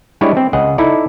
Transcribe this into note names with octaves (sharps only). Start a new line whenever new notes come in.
G3 G#3 D4 E4 C#5 D5
C4
C#2 G#4 D#5 F#5
D#4 E4 A4 D5